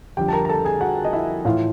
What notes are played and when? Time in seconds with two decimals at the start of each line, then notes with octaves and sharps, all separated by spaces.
0.17 F2 D3 G3 G4 G5
0.28 A5
0.33 A#4 A#5
0.45 A#5
0.49 A4 A5
0.65 G#4 G#5
0.81 F#4 F#5
1.05 D#5
1.13 E4 E5
1.45 A2 E3 A3 F4 F5